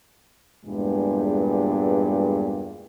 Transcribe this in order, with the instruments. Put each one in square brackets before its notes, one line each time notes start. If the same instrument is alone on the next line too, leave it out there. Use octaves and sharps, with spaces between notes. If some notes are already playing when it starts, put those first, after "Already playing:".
[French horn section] E2 G2 A#2 G#3